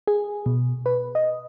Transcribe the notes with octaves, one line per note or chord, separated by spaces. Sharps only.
G#4
B2
B4
D#5